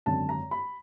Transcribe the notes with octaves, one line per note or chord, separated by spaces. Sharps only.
G#1 F#2 D3 A5
A#5
B5